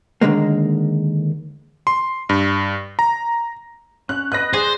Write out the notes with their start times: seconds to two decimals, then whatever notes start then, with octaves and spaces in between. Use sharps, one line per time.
0.21 D#2 A#2 D3 G#3 A#3
1.87 C6
2.29 G2
2.99 A#5
4.09 C#4 F#6
4.32 B3 B4 D#5 F#6 A#6
4.53 G#4 C5 D5 D6